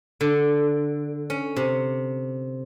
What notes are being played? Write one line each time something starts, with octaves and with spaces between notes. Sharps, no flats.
D3
C#4
C3